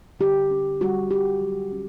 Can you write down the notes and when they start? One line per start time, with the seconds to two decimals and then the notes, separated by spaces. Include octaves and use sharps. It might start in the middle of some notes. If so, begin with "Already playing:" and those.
0.20 D3 G4
0.51 C#4
0.81 G3 F#4
1.11 G3 G4
1.41 F#3
1.72 C#4